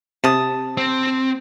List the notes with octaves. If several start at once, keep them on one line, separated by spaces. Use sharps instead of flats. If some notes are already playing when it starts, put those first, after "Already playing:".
C3 A5 D#6
C4